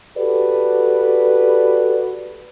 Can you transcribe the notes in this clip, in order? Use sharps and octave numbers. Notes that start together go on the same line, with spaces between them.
F#4 G4 A4 B4 D5